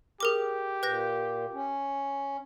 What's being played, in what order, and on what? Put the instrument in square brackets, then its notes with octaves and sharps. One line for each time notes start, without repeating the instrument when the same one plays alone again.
[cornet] G4 [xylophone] G#4 A#4 D6
[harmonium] A#2 [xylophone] B4 G6 A#6
[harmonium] C#4